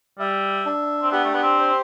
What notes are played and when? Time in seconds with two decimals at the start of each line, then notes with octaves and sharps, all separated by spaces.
0.19 G3 E5
0.66 D4
1.02 C4
1.12 B3 G4
1.24 A3
1.34 B3
1.43 C4
1.58 C5